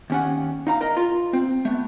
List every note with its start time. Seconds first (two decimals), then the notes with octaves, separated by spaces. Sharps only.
0.10 D#2 C#4 F#5
0.67 D#4 F5 A#5
0.81 A#4 D#5 A#5
0.97 F4
1.33 C4
1.65 A3 B3